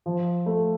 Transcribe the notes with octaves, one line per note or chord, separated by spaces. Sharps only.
F3
A3